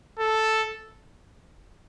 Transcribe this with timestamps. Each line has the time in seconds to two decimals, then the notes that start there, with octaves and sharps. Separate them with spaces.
0.19 A4